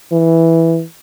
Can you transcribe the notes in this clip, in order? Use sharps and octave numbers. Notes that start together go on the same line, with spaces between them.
E3